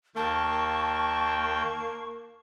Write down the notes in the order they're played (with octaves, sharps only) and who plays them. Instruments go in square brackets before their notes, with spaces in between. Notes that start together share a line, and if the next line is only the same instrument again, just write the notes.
[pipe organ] D#2 G5 [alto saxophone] A#3 [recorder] A5 [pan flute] C#6